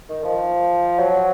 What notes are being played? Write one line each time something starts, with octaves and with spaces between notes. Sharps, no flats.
D#3
F3
F#3